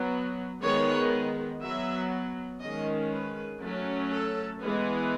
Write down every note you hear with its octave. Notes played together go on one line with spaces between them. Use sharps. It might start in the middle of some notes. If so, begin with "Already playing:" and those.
Already playing: F#3 B3
D#3 G#3 B3 C#5
F#3 B3 E5
D#3 G#3 C#4 D#5
B4
F#3 A3 C#4
A4
E3 G#3 B3